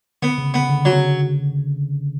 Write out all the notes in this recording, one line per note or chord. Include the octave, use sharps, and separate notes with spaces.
D3 B3
C#3
B3
C#3
D3
C#3 F#3